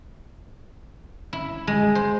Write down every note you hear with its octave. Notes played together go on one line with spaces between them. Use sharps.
E4
G#3
C5